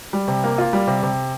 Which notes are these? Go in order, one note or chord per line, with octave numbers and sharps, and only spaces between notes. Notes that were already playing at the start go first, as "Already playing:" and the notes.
G3
C3
A#3
F4
G3
C3
C3